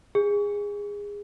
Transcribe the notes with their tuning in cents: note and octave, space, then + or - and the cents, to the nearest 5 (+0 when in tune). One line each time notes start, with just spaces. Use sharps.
G#4 -20